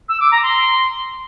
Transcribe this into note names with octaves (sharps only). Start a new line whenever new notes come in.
E6
D6
A#5
C6